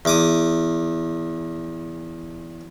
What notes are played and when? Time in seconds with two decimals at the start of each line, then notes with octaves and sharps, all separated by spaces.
0.05 E2 D6 D#6